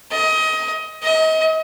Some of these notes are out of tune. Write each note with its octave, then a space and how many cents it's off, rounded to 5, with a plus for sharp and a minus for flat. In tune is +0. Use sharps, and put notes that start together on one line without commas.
D#5 +25
D#5 +35